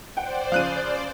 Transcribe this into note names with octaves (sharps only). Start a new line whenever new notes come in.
C5 D5 F#5 G5
C#3 F3 F5 F#6 D#7